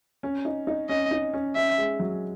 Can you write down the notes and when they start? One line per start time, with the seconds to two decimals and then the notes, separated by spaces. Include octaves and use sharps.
0.23 C#4
0.45 D#4
0.67 D#4
0.89 C#4 D#5
1.11 D#4
1.33 C#4
1.56 C#4 E5
1.78 G#3
1.99 F#3